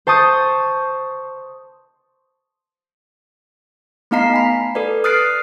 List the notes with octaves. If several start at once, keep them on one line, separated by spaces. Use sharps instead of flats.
C5 A5 C#6 D#6 G6
A3 B3 D#4 F5 A#5 C7
G#5 B5
A4 B4 D5
D#6 F6 F#6 A6 C7 D7